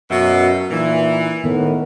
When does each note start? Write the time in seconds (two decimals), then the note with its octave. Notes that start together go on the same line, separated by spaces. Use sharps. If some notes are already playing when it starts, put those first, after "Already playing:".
0.11 F#2 B2 F#4 E5
0.70 A#2 E3 D#4
1.44 A2 D#3 B3 A#4